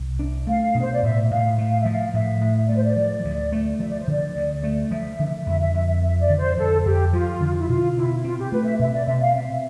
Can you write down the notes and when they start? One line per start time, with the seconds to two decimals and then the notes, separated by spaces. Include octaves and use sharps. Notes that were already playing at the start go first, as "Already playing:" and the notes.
Already playing: C2
0.19 D4
0.47 A3 F5
0.75 B2
0.82 C5
0.93 D5
1.03 A2 E5
1.31 A2 F5
1.58 A3
1.69 F5
1.80 E5
1.85 F3
1.91 F5
2.14 A2 E5
2.41 A2
2.69 A3 D5
2.76 C5
2.84 D5
2.97 F3
3.25 D2
3.52 A3
3.80 F3 E5
3.90 D5
4.00 C5
4.07 D3 D5
4.36 D2
4.63 A3
4.91 F3 E5
5.19 D3
5.47 F2 E5
5.60 E5
5.74 F2 E5
5.88 E5
6.02 F3 E5
6.20 D5
6.29 D3
6.39 C5
6.57 F2 A4
6.85 F2 G4
7.13 F3 F4
7.41 D3
7.59 E4
7.69 B2 F4
7.96 B2 E4
8.24 C4 F4
8.38 G4
8.52 A3 B4
8.65 E5
8.79 B2 E5
8.94 D5
9.06 B2 E5
9.21 F5
9.35 C4 E5